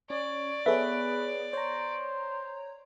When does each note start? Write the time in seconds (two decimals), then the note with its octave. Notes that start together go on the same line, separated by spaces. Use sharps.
0.10 C#4 C#5 D5
0.66 B3 G#4 A4 B4 C#5 E5
1.53 C5 C#5 A#5